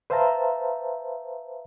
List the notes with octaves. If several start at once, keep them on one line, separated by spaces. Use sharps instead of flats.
B4 C5 E5 F5 A5 A#5